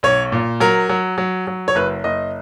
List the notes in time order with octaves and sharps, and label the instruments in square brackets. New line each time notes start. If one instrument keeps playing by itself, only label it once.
[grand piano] B1 C#5
A#2
F#3 A#4
F#3
F#3
F#3
C#5
F#1 B4
F#1 D#5